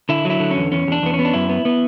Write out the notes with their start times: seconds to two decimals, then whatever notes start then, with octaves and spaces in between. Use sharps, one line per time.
0.09 D3 E4
0.25 F#3 E4
0.40 D3
0.51 C#4
0.56 E2
0.72 E2 C#4
0.87 E2 D4
1.02 E2 B3
1.14 C#4
1.19 B3
1.25 D4
1.34 F#2 E4
1.49 B3
1.65 B3